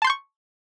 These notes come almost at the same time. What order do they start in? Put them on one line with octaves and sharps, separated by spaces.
A5 C6 G6 C#6